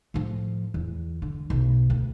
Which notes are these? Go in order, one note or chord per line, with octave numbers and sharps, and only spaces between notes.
A2 F3
E2
D3
B1 B2
D2